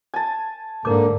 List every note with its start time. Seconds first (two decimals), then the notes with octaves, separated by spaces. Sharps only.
0.14 G#5 A5
0.85 G#2 D3 A#3 A#4 D6